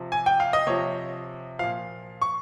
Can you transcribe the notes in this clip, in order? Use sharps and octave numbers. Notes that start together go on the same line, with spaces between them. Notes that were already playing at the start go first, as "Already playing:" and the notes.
Already playing: C3 F3
G#5
G5
F5
D#5
C3 F3 C#5
A#2 F3 F5
C#6